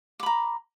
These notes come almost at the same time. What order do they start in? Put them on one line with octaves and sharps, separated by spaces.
D6 B5 A#5